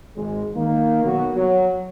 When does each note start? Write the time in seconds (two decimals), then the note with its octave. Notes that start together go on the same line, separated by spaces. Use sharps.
0.16 G#1 G#3
0.55 D#3 A#3
1.05 B1 F#3 B3 F#4
1.35 F#3